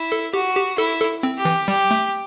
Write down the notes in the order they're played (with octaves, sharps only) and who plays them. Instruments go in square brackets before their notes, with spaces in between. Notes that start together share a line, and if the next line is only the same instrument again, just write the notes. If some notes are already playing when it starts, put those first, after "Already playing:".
Already playing: [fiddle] E4
[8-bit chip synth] A4
[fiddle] F#4 [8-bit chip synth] G4
[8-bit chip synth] G4
[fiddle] E4 [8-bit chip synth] A4
[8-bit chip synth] A4
C4
[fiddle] G4
[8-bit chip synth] E3
[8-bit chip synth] G3 [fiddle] G4
[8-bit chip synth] A3